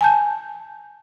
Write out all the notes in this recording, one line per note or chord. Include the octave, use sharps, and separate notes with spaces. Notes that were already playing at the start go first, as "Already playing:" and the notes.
G#5 A5 G6